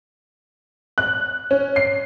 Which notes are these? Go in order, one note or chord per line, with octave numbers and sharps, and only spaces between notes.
F#6
C#4
C7